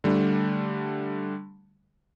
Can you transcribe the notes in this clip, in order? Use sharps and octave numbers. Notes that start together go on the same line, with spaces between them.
D3 G3 A3 D4